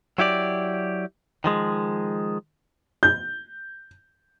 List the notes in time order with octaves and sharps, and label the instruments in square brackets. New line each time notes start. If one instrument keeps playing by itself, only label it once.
[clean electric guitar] F#3 E4 G4 D5
D#3 F3 G#3
[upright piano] G6